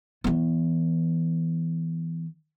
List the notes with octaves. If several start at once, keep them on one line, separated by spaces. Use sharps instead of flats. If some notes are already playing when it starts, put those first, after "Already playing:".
E3 B3